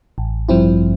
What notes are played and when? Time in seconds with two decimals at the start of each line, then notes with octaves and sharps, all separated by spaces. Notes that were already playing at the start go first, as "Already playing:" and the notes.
0.18 A1
0.49 G2 F3 C4 E4